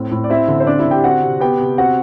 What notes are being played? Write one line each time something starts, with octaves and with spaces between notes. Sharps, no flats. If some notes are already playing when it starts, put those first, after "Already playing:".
Already playing: A2 C4
A2
D5
C4 E4 E5
D3
C5
C4 D4 D5
E4 E5
D3
G4 G5
C4 F#4 F#5
C3
B3 G4 G5
C3
C4 F#4 F#5